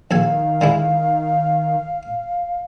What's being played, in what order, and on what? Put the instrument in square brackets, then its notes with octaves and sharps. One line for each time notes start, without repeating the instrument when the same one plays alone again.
[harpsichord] A#1 A4 G#5 [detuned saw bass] D#3 [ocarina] F5
[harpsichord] D3 G#3 E4